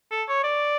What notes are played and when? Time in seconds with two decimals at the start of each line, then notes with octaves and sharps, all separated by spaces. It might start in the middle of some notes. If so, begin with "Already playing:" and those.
0.11 A4
0.29 C#5
0.44 D5